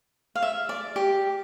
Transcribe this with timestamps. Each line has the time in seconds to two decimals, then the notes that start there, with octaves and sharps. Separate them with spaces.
0.35 F5
0.43 E5
0.69 D5
0.96 G4